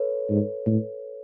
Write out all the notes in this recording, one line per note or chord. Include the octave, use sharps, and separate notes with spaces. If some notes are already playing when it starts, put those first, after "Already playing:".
Already playing: A4 B4 C#5
G#2
A2